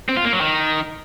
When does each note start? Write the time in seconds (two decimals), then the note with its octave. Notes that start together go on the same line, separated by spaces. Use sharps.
0.09 C4
0.17 F4
0.25 A#3
0.32 F#3
0.40 D#3